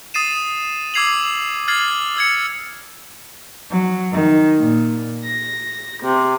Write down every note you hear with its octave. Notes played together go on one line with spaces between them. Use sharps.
D#6 A6 C7 D#7 E7
D6 E6 G#6 C7 F7 F#7
F6 G#6 A6 C7 F#7
E6 G#6 C#7
F#3
D#3
A#2
A#6
C3